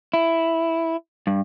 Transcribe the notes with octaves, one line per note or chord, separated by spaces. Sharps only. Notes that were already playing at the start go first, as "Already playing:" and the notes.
E4
G2